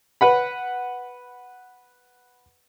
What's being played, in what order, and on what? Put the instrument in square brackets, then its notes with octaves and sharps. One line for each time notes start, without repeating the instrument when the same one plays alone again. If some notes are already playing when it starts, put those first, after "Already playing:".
[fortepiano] B4 F#5 B5